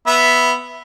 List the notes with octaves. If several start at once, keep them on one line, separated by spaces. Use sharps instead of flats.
B3 E5